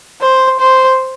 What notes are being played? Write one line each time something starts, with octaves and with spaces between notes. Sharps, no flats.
C5
C5